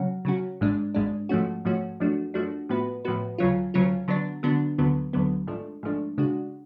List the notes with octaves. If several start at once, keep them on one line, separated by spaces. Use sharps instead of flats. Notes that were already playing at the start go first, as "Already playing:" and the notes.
Already playing: C#3 F#3 C#4 F#4
C#3 F#3 C#4 F#4
G#1 G#2 G#3 D4
G#1 G#2 G#3 D4
G#2 F3 A3 C#4 F#4
G#2 F3 A3 C#4 F#4
F#2 F3 A3 D4 F#4
F#2 F3 A3 D4 F#4
A2 F3 B3 F#4 B4
A2 F3 B3 F#4 B4
D2 C#3 F#3 C#4 F4
D2 C#3 F#3 C#4 F4
D3 F#3 B3 D4
D3 F#3 B3 D4
D2 D3 F#3 B3
D2 D3 F#3 B3
G#1 G#2 F3 A3 D4
G#1 G#2 F3 A3 D4
C#3 G#3 D4 F#4